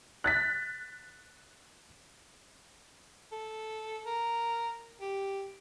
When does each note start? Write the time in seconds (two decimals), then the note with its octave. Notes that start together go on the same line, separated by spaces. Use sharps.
0.24 F#6 A6 B6
3.32 A4
4.06 A#4
5.01 G4